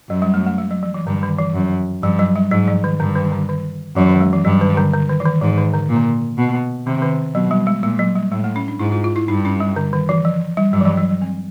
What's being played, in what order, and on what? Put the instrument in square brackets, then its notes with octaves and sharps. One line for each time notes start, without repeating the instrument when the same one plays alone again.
[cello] F#2 [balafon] F#3
[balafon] G3
A3
A3
G#3
F#3
F3
E3
[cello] G2 [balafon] D3
[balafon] D#3
E3
[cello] F#2
[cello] G2 [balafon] F3
[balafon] F#3
G3
[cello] G#2 [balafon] F#3
[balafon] F3
D#3
[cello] G2 [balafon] D3
[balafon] D#3
D3
D#3
[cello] F#2 [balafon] E3
[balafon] D#3
G#3
E3
[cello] G2 [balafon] F#3
[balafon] D#3
D3
D3
D#3
E3
D#3
[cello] G#2 [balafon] E3
[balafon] D#3
D3
[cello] A#2
[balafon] D3
[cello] B2
[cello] C3 [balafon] D#3
[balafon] D#3
[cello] B2 [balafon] F#3
[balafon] G3
G#3
[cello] A#2 [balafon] G#3
[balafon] F#3
G3
[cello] A2 [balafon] G#3
[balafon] A3
C#4
D4
[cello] G#2 [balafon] E4
[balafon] F4
F4
E4
[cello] G2 [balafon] D#4
[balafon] C#4
G3
D3
D#3
E3
F3
G3
[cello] G2 [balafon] F#3
[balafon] E3
F3
F#3
F#3
C4